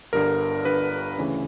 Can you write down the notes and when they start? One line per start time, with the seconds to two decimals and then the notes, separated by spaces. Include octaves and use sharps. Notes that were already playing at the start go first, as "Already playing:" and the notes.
0.13 G1 G2 D3 A#4
0.65 G1 G2 D3 B4
1.18 D2 C#3 E3